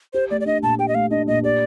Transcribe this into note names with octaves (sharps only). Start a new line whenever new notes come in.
G4 C5
A3 D5
D5
D4 D#5
A#2 A5
G4 G5
D#5
A3 F5
D4 D#5
A#2 D#5
G4 D5